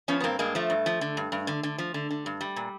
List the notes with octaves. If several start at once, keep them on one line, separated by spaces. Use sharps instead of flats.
F3 B3 C#4
B3
G2 A#3 C4
G2 G#3 A#3
F3 A3
G2
F3
D3
G2
G2
D3
D3
F3
D3
D3
G2
G3
A#2